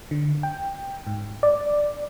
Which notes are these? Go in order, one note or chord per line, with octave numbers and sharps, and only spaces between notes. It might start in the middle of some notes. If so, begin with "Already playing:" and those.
D3
G5
G#2
D5